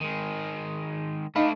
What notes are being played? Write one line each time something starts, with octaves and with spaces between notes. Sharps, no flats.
D#3 G#3
A3 D4 D#4 D#5 F5 B5